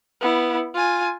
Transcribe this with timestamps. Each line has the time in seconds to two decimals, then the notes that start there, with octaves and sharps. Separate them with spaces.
0.21 B3 E4
0.74 F4 G#5